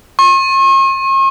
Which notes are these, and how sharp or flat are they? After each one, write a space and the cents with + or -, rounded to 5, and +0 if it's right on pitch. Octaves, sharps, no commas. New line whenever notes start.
C#6 -45